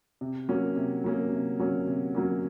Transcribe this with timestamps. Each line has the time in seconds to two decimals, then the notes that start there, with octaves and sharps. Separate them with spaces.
0.21 C3
0.49 F#3 A#3 C#4
0.76 C3
1.04 F#3 A#3 C#4
1.32 C3
1.59 F#3 A#3 C#4
1.87 C3
2.15 F#3 A#3 C#4